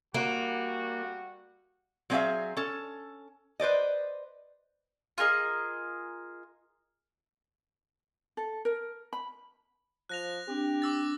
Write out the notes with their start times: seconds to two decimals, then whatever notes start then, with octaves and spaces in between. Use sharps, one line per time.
0.14 G3 A#3 F#4
2.10 F#3 C4 G#4 C5 E5 F5
2.57 C#4 A4
3.60 B4 C5 D5 D#5
5.18 F4 G#4 A#4 D#5
8.37 A4
8.65 A#4
9.13 B5
10.09 F3 F#6 A#6 F7
10.48 C4 D4 G4
10.82 D6 E6 A6